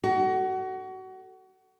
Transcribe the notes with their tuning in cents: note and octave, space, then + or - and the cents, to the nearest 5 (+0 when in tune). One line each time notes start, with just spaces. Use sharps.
F#4 +25 A4 +10